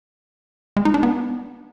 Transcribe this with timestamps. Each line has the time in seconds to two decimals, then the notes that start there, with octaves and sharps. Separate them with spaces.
0.77 G#3
0.85 D#4
0.94 D4
1.03 B3